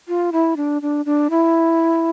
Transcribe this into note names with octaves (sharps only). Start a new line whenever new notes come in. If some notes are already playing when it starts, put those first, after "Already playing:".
F4
E4
D4
D4
D4
E4